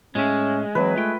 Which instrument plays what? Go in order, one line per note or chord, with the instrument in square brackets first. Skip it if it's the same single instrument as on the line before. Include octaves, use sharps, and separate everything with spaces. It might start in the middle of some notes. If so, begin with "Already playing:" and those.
[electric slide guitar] A2 E5 [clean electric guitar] G#3 [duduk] C#4
[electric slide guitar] E3 A#3 C4 [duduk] F#3 [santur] B4
[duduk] A3 [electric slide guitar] F4 G5